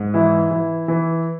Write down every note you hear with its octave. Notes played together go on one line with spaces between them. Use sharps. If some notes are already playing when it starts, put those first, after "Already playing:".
Already playing: G#2
E3 E4
E3
E3